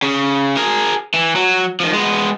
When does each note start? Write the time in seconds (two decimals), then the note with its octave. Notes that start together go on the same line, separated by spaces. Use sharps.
0.02 C#3
0.57 G#4 A#4
1.14 E3
1.35 F#3
1.80 D#3 F3
1.94 G#3 B3